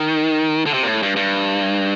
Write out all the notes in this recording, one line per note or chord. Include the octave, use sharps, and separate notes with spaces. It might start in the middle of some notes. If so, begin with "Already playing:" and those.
Already playing: D#3
D3
C3
A#2
A2
G2
G2